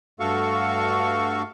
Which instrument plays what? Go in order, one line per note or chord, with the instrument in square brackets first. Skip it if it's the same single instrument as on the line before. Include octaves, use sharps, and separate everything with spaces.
[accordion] G2 A3 F#4 A4 F5 C#6